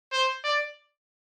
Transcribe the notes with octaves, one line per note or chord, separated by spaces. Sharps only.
C5
D5